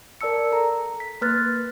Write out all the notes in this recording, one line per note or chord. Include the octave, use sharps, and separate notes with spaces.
A#4 D5 A5 E6 C#7
A4 A#5
B6
A#3 B4 F6 F#6 A6